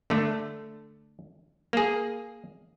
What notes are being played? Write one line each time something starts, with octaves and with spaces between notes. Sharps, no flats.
D3 A3
A#3 G#4